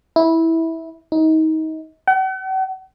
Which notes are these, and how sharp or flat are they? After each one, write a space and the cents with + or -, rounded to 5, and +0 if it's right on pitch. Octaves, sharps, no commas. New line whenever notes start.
E4 -15
D#4 +25
F#5 +45